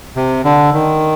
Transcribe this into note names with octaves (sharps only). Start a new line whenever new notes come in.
C3
D3
D#3